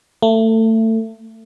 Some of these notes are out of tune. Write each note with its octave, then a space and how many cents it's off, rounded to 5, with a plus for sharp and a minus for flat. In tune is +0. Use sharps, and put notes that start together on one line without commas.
A3 +25